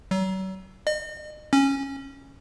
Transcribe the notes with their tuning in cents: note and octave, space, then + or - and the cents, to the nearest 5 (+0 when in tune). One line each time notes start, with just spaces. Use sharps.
F#3 +40
D#5 -40
C#4 -15